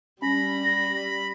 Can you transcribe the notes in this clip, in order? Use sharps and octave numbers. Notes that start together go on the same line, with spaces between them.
G3 C#4 B5 A#6